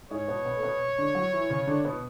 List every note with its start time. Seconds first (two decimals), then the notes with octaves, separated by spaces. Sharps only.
0.11 G#2 G#3 C#5
0.28 B2 B3
0.45 B2 B3
0.57 A3
0.63 B2 B3
0.98 D3 D4
1.15 F#3 F#4
1.32 E3 E4
1.50 C#3 C#4
1.67 D3 D4
1.85 B2 B3